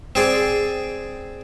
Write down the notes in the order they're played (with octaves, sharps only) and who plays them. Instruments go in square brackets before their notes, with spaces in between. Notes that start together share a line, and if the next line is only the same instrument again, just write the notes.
[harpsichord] C4 G#4 D5